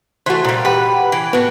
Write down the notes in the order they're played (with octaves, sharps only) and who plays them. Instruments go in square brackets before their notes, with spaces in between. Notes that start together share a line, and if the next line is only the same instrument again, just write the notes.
[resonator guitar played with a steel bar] E3 A3 [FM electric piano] F#4 C5
[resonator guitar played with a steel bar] A#2 G3
[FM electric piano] G4 F#5 B5 [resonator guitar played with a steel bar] B4
[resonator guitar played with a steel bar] E3
[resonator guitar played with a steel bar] A2 F#4 [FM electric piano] B3